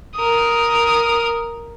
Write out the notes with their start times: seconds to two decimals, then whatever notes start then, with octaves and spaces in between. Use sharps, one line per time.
0.15 A#4 D#6